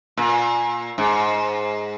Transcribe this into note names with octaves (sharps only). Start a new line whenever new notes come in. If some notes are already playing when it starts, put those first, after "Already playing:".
A#2
G#2